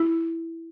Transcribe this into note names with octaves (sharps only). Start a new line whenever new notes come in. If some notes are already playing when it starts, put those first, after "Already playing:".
Already playing: E4